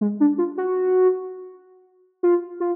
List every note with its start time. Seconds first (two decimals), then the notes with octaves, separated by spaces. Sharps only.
0.01 G#3
0.20 D4
0.38 F4
0.58 F#4
2.23 F4
2.60 F4